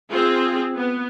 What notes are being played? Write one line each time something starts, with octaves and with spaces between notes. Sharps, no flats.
C4 F4 G#4
B3